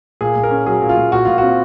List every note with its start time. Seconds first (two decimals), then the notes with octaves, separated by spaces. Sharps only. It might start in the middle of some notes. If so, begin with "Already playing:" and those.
0.21 A#2 G#4
0.36 A#2
0.43 A#4
0.51 C#4
0.66 F#3 G#4
0.82 A#2
0.89 F4
0.97 A#2
1.12 A#2 F#4
1.25 A#2 F4
1.38 C4 F#4